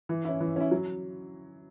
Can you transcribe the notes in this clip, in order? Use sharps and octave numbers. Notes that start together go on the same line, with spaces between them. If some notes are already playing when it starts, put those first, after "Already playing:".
E3
C#4 E4
E3
C#4 E4
F#3